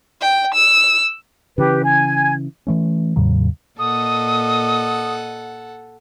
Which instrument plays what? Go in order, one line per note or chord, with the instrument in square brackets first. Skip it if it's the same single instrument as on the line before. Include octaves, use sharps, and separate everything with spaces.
[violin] G5
E6
[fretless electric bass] C#3 E3 [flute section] G4 B4
[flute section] G#5 G#6
[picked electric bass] E3 A3 C#4
E2 A2 C#3 F#3
[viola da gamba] A#2 D#5 [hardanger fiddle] A4 F#5 [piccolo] D#6